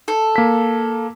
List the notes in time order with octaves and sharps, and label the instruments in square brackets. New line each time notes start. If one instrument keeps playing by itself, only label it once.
[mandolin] A4
[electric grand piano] A#3 B6